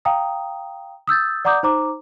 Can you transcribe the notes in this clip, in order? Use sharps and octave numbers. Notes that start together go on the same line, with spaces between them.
F5 G5 A#5 D#6
D#6 E6 G6 A6
D5 F#5 A#5 D6 D#6 G6
D#4 C5 A#5 D6